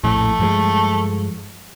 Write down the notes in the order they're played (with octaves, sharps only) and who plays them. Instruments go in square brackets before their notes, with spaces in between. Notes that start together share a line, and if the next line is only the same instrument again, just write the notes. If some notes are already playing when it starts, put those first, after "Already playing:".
[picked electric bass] A#1 F2 A2 [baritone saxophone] A3
[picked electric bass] G2 F3 G#3